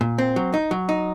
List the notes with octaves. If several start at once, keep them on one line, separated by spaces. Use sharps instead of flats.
A#2
C4
F#3
D#4
F#3
D#4